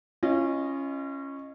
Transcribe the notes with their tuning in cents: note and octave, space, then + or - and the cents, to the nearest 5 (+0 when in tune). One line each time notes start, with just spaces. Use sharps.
C#4 -10 F4 -45 D#5 -10